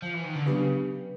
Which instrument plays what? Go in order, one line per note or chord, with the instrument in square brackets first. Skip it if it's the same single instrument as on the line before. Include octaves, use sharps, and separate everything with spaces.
[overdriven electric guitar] F3
E3
D#3
D3
[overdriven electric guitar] C#3 [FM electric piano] F#3 B3 D4 G4 B4